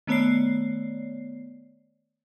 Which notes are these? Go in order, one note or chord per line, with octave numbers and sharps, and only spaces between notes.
D#3 A3 B3 C#5 D5 C7